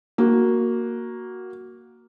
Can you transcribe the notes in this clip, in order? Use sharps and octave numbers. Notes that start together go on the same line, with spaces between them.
A#3 F#4